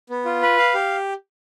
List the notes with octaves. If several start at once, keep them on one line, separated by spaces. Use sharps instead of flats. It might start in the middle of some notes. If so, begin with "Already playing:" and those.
B3
F4
B4
F5
G4